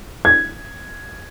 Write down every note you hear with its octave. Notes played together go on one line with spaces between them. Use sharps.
G#6